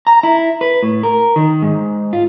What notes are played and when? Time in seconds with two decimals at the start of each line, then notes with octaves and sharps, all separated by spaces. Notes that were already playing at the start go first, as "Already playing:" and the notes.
0.07 A#5
0.23 E4
0.61 B4
0.83 A2
1.03 A#4
1.36 D#3
1.62 G#2
2.13 F4